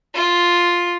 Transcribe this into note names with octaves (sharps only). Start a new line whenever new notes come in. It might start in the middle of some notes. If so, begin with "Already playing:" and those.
F4